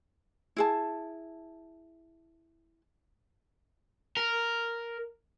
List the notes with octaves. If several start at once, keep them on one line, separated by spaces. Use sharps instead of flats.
E4 G#4 A5
A#4